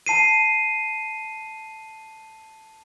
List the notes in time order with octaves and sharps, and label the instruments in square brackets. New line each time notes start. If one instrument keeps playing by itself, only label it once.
[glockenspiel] A5 C7 D#7